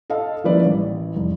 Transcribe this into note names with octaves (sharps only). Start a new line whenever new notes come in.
A4 D#5 F5 A5
F3 A#3 C#4 E4 B4 D5
A1
F1